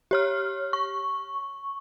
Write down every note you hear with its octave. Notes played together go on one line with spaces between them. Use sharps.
G4 C#5 F6
C#6